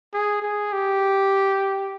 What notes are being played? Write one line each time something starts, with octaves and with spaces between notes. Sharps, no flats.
G#4
G#4
G4